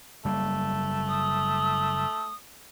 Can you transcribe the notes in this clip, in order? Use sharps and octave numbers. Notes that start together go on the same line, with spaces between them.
F#1 G3 A3 A#3
D#6